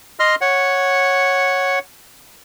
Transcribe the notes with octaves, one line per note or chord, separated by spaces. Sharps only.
D#5 C6 F6
C#5 F#5